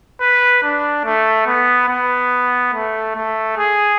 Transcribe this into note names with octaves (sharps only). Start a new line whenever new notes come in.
B4
D4
A3
B3
B3
A3
A3
G#4